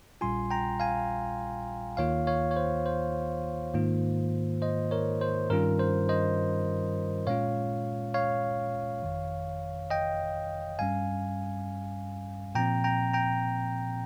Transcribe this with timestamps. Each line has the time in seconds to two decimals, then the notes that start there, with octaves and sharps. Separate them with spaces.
0.21 A#1 A#2 G3 C#4 F4 G#5 C6
0.51 G5 A#5
0.80 F5 G#5
1.97 D#2 D#3 A#3 F4 C#5 F5
2.27 C#5 F5
2.51 C#5
2.56 C5
2.86 C5
3.74 G#2 D#3 A#3 F4
4.62 C5 D#5
4.91 A#4 C#5
5.21 C5
5.50 G2 D#3 G3 C#4 F4 A#4
5.79 C5
6.09 C5 D#5
7.27 A#2 G#3 C#4 F4 C#5 F5
8.14 C#5 F5
9.03 G1 F2 D#3
9.90 D#5 G5
10.79 G2 G3 C#4 F5 G#5
12.55 A#2 F3 C4 G5 A#5
12.84 G5 A#5
13.13 G5 A#5